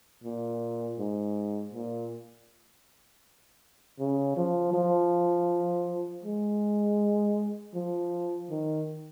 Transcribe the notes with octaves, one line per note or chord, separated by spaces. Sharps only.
A#2
G#2
A#2
C#3
F3
F3
G#3
F3
D#3